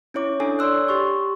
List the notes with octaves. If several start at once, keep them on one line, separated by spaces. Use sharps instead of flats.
C#4 E4 C#5 D6
D4 E4 A4 C#5 G#5
C#5 D5 C6 E6 F#6
G4 C6 C#6